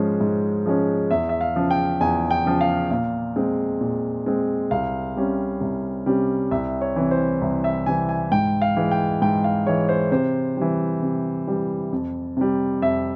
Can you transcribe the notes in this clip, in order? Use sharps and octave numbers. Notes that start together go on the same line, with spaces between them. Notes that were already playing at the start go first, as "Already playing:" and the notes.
Already playing: G#2 F3 G#3 C#4 C5
G#2
F3 G#3 C#4
E2 E5
E5
F5
C#3 F3
G5
E2 G#5
G5
C#3 F3
F5
A#2 F5
G#3 C4
A#2
G#3 C4
C2 F5
C3 G3 C#4
C2
C3 G3 C#4
C2 E5
C#5
C3 E3
C5
C2
E5
C3 E3 G#5
G#5
G#2 G5
F5
E3 G#3
G5
G#2 G5
F5
E3 G#3 C#5
C5
C3 C5
E3 G3
C3
E3 G3
F2
C3 G3
F2 E5